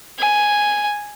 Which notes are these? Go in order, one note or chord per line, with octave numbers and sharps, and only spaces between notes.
G#5